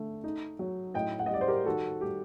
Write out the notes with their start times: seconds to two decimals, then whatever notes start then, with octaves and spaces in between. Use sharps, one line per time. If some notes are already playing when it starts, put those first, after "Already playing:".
Already playing: D3 A3
0.24 D#4
0.59 F#3
0.94 A2 D#5 G5
1.19 F#5
1.26 D#5
1.30 G3 D5
1.41 C5
1.48 G4 A#4
1.65 D#3 F#4 A4
2.01 G3 G4